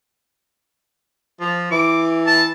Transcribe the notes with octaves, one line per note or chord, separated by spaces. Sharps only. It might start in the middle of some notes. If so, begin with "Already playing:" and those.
F3
E3 D6
A5